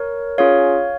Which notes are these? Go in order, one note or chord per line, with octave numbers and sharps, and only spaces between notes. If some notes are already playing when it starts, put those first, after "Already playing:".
Already playing: A#4 C#5
C#4 F4 G#4 C#5 F5